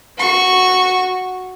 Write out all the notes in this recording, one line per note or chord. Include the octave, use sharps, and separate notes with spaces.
F#4 C#6